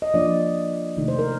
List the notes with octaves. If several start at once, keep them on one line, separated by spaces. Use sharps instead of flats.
D#5
F3 A#3 D4 D5
C3 D#3 A3 D#4
C5
A#4